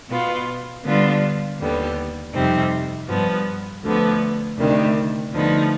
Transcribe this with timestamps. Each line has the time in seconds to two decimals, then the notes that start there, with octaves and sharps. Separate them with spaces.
0.10 B2 B3 F4
0.84 D3 G3 B3 D4 F4
1.59 D#2 D3 G3 B3
2.33 F2 C3 G3 C4 D#4
3.08 G2 F3 B3
3.83 D2 D3 F3 B3
4.57 D2 C3 D#3 G3 D4
5.32 D2 D3 F3 B3 D#4